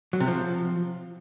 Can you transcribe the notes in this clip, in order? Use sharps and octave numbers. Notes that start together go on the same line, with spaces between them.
F#3
C3
F3